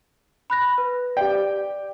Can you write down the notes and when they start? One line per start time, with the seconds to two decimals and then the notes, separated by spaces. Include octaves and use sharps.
0.50 B5 F#6 A#6
0.78 B4
1.17 G4 D5 G5